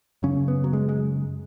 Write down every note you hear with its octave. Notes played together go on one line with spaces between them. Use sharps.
F#2 C#3 C#4
B3
F#3
G#3
G#3